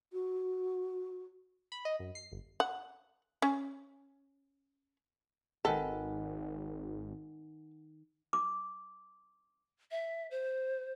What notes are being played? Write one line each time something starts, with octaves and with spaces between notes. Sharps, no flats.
F#4
B5
D#5
F#2
C7
G1
F#5
C#4
G#1 D#3 A4 B4 F#5 G#5
D6
E5
C5